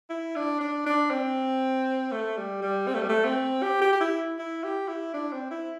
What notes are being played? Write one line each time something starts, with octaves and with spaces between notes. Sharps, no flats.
E4
D4
D4
D4
C4
A3
G3
G3
C4
A3
G3
A3
C4
G4
G4
G4
E4
E4
G4
E4
D4
C4
E4